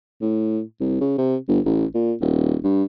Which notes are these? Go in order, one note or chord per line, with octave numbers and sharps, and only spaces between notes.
A2
C2
C#3
C3
G1
A1
A#2
D#1
G2